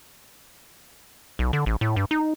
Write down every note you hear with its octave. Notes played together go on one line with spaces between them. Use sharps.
B1
D3
A1
A2
G2
D#4